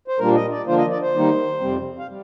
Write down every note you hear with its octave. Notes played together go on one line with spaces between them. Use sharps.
C5
A#2 G3 A#3 D4 A#4
D#5
D5
D3 F3 A#3 D4 F4 C5
D#5
D5
C5
D#3 G3 A#3 D#4
F2 C3 G3 C4
F5
G3